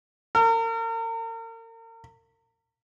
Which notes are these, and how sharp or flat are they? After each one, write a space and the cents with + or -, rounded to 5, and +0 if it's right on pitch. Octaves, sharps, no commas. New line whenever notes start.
A#4 -40